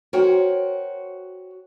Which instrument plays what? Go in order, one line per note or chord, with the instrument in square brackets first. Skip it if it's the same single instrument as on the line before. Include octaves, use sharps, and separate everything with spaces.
[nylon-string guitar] F#4 A#4 C5 C#5 G5